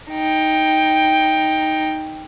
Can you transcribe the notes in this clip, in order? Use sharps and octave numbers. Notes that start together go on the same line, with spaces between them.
D#4 G5